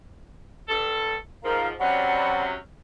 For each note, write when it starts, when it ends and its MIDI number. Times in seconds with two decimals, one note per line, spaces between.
0.69 1.16 43
0.69 1.16 69
1.44 1.73 44
1.44 1.73 53
1.44 1.66 70
1.44 1.66 77
1.44 1.66 82
1.80 2.55 48
1.80 2.55 54
1.80 2.55 61
1.80 2.43 74
1.80 2.43 78
1.80 2.43 83